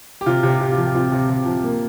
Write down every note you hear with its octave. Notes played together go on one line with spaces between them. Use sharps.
G4
C3 F4
C3
G4
C3
F4
F3
G4
C4 F4
C3
C3
F3
A#3